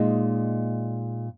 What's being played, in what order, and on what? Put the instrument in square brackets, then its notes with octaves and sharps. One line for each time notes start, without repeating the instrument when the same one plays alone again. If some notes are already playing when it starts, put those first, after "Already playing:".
Already playing: [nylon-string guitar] A#2 G#3 D#4